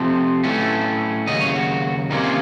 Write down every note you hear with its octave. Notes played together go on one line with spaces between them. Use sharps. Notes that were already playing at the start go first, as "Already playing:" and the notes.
Already playing: C3 F3 A3 C4
A2 F#3 A3 C#4
D#2 C#3 F#3 D#5
C#5
F#4
C2 C3 D#3 A#3 C#4 D#4
F4